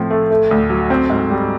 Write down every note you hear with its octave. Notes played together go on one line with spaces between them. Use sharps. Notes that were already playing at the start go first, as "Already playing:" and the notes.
Already playing: A2 F3 C4
A3
A3
D2
F#3
C4
G#2
G3